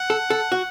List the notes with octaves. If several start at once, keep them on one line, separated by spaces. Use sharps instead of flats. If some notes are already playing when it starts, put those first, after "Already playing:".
Already playing: F#5
A4
A4
F#4